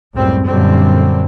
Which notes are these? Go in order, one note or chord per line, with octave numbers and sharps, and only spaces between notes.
C#2 F#2 A2 G3 C4
F#2 A#2 D3 G3 C4